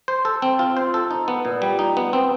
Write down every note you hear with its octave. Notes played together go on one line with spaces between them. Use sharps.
C5
A4
C4
F4
C5
A4
D#4
B3
A#2
G3
D#4
B3
C4